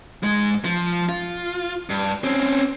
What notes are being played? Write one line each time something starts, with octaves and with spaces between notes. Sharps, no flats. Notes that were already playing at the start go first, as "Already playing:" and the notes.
G#2 G#3
F3
F4
G2
C4 C#4